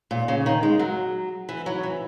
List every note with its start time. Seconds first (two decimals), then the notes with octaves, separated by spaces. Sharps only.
0.11 A#2
0.28 C#3
0.46 D#3
0.63 G#3
0.79 F#3
1.49 E3
1.66 F#3
1.83 E3